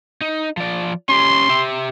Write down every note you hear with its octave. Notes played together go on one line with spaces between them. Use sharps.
D#4
F3 D5
C#4 G4 C6
G4 E5